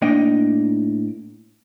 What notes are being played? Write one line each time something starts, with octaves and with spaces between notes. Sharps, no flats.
A2 A#3 D4 D#4 D#5 G5